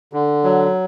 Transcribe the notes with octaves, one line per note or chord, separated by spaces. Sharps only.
D3
F#3